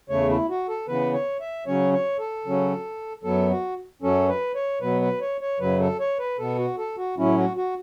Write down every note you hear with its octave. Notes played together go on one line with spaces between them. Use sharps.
E2 C#3 A3 C#5
E4
F#4
A4
C#3 E3 B3 B4
C#5
E5
C#3 F#3 C#4 C#5
C#5
A4
C#3 F#3 C#4
F#2 F#3 B3 A4
F#4
F#2 F#3 C#4 A4
B4
C#5
B2 F#3 B3 B4
B4
C#5
C#5
F#2 C#3 F#3 B4
A4
C#5
B4
B2 B3 A4
F#4
A4
F#4
A2 F#3 C#4 E4
F#4
F#4